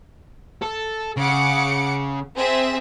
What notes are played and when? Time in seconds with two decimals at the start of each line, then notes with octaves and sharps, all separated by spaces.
0.62 A4
1.17 C#3 F#5 D6 C#7
2.36 C4 G#4 E5